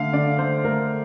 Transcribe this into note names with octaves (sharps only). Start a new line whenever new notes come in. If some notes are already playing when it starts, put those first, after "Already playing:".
Already playing: D3 A3 F5
D3 D5
A3 C5
A3 A#4